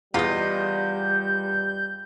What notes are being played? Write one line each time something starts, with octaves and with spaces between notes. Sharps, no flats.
E2 G3 F4 D#5 G6